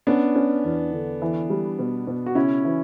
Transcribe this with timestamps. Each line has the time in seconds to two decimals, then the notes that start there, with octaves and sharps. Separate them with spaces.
0.07 B3 C#4 D4
0.35 C#4
0.64 E2
0.93 D3
1.22 E3
1.50 G3
1.79 B2
2.07 B2
2.26 F#4
2.35 C#3 C#4 E4
2.65 E3